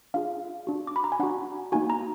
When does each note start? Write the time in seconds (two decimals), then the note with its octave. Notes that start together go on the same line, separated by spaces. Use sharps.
0.14 D4 F4 G#4 F5
0.67 D4 F#4
0.87 D6
0.96 B5
1.04 A#5
1.12 G#5
1.19 D4 F#4 F#5
1.72 A#3 D#4 F#4 G#5
1.90 A#5